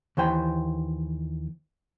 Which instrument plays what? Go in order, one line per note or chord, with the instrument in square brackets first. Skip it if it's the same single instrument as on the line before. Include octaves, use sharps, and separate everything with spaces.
[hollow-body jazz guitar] D#2 E3 C5 G5